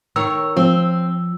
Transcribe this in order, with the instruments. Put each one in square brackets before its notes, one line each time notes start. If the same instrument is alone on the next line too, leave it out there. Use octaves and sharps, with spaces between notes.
[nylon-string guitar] D#3 A#4 C#5 [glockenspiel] E6
[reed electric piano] F3 [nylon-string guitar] C4